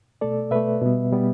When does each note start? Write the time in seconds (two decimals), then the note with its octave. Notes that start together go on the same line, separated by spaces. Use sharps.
0.21 B2 A3 A4 D5
0.51 B2 A3 B4 E5
0.82 B2 G3 B3
1.11 B2 G3 B3